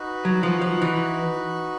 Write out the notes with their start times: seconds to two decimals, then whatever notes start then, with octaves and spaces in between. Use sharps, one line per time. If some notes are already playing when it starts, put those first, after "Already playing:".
Already playing: D#4 F#4 B4
0.25 F#3
0.43 F3
0.61 F3
0.82 E3